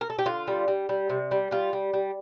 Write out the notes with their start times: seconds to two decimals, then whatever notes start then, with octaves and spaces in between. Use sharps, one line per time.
0.01 A#4
0.10 A4
0.19 G4
0.26 D3 F4
0.48 G3
0.68 G3
0.89 G3
1.09 C3
1.31 G3
1.51 G3 F4
1.73 G3
1.93 G3